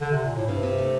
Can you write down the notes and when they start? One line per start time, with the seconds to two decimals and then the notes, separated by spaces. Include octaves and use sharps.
0.01 D3
0.12 C3
0.24 A#2
0.36 A2
0.48 G2 C3
0.63 C3
0.78 A3